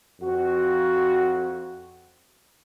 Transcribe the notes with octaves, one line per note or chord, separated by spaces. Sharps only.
F2 F#4